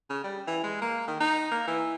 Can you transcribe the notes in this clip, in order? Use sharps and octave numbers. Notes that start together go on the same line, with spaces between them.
C#3
G3
E3
G#3
A#3
D#3
D#4
A#3
E3